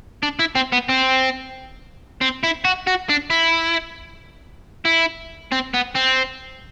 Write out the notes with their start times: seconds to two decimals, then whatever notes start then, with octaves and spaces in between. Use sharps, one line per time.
0.23 D4
0.39 E4
0.55 C4
0.73 B3
0.89 C4
2.21 C4
2.43 E4
2.65 F#4
2.87 F#4
3.10 D4
3.30 E4
4.85 E4
5.52 C4
5.74 B3
5.95 C4